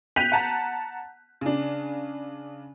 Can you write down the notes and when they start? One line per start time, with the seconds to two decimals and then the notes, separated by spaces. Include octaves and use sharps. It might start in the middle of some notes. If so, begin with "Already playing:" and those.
0.16 G5 F#6 G6 B6 D#7 F7
0.32 F#5 A5 A#5
1.41 C#3 D4